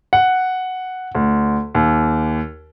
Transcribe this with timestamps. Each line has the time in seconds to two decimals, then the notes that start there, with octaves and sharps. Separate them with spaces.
0.13 F#5
1.15 D2
1.75 D#2